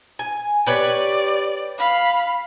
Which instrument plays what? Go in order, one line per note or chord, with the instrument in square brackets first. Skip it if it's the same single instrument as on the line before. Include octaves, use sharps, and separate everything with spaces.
[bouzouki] G#5
[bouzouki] G4 B4 C#5 [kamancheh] D5
[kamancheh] F5 B5